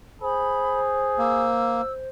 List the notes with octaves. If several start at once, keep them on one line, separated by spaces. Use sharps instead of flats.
G#4 C5 B5
A#3 E6